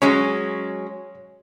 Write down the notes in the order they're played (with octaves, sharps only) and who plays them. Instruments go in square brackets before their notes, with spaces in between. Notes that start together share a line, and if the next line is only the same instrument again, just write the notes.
[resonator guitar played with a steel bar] F#3 G#3 C#4 [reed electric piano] C#5